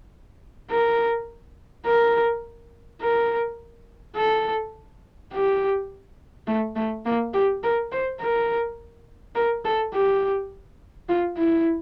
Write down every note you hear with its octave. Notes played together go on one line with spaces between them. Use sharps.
A#4
A#4
A#4
A4
G4
A3
A3
A#3
G4
A#4
C5
A#4
A#4
A4
G4
F4
E4